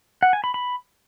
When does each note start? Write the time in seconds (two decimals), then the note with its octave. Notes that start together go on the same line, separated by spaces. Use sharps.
0.23 F#5
0.33 G#5
0.44 B5
0.54 B5